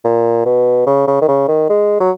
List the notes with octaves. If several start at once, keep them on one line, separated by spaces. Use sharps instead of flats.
A#2
B2
C#3
C#3
D#3
C#3
D#3
G#3
F#3